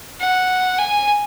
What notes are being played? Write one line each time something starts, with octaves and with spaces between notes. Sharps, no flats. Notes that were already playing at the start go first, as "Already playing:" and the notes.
F#5
G#5